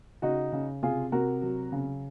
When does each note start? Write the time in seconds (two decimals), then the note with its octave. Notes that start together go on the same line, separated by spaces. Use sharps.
0.22 C#3 D#4 F#4
0.53 C#3
0.83 C3 F4 G#4
1.12 C3 F#4 A#4
1.42 F#3
1.72 C#3